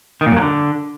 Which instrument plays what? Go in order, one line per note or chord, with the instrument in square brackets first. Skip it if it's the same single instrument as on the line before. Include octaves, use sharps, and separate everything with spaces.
[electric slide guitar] D#3
A#2
F#2
F#3
D3